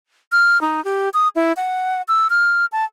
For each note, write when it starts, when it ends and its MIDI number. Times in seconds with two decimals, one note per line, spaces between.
0.32 0.60 89
0.61 0.83 63
0.85 1.09 67
1.14 1.28 87
1.36 1.52 64
1.57 2.02 78
2.08 2.27 88
2.30 2.66 89
2.72 2.85 81